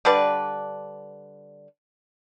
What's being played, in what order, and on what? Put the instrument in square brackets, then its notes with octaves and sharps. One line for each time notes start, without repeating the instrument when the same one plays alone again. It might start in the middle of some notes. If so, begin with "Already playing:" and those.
[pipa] D3 G3 B4 D5